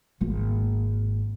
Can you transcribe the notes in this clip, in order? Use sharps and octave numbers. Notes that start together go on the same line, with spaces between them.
G#1 A#3